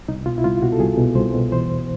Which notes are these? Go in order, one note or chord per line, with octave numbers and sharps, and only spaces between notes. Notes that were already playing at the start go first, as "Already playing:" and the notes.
C2 D#4
B2 F4
E4
C2 F4
B2 F#4
A4
C2 G#4
B2
C2 C5
B2
E3 C5
E2